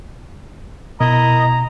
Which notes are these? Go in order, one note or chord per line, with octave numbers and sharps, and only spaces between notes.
B2 E4 A#4 D#5 A#5